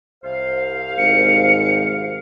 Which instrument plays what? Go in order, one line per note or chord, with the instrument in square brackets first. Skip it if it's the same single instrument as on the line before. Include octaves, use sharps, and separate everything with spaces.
[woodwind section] C2 C5 F5
[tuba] G#1 [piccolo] C#7